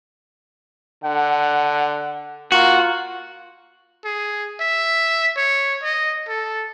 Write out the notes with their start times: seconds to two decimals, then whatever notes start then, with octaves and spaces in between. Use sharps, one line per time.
1.04 D3 F#5
2.52 A#3 F4 F#4
4.05 G#4
4.61 E5
5.37 C#5
5.83 D#5
6.28 A4